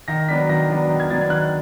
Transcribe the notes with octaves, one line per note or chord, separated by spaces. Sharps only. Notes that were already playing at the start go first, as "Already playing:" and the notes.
D#3 A#6
F#3 B3 D4 B6
D#3 A#6
F#3 B3 D4
D#3
G#6
F#3 B3 D4 A6
G#6
D#3 F#6